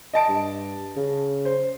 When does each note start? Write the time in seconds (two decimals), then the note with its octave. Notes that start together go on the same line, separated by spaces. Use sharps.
0.13 D#5 A5 D7
0.29 G2
0.97 C#3
1.45 C5